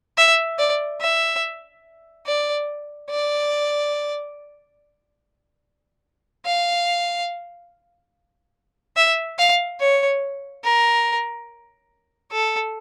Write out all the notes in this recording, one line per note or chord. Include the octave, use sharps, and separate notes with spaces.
E5
D5
E5
D5
D5
F5
E5
F5
C#5
A#4
A4